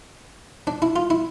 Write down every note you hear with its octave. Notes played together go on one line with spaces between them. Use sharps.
D4
E4
F4
E4